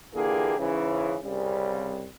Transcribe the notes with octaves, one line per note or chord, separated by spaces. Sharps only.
A#2 D3 E3 A#3 G4 G#4
G#2 C#3 E3
C2 C#3 G3